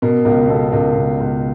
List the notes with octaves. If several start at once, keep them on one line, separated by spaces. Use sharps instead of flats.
B2 A#4
C#2 A#4
B2 A4
C#2 A#4
B2
C#2